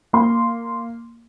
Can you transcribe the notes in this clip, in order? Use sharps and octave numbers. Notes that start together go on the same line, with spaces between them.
A#3 C6